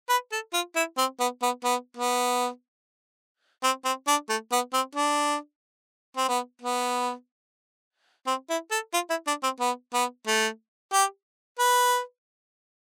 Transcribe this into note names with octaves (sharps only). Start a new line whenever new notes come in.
B4
A4
F4
E4
C4
B3
B3
B3
B3
C4
C4
D4
A3
B3
C4
D4
C4
B3
B3
C4
E4
A4
F4
E4
D4
C4
B3
B3
A3
G4
B4